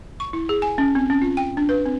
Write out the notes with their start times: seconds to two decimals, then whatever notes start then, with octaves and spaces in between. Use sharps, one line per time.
0.20 C#6
0.33 E4
0.49 G#4
0.62 G#5
0.78 C#4
0.95 C4
1.10 C#4
1.22 F4
1.37 G5
1.57 D4
1.69 B4
1.86 C4